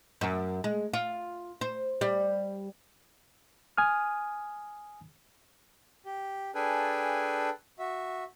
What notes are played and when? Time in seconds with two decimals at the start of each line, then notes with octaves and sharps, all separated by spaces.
0.21 F#2
0.64 G#3
0.94 F4
1.61 C5
2.01 G3
3.77 G#5 D#6 F6
6.06 G4
6.55 D4 G#4 A4 B4 G5 G#5
7.79 F#4 E5